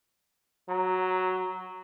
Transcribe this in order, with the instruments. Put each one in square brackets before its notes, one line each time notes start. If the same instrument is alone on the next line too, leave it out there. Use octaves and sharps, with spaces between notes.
[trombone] F#3 [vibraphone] A#5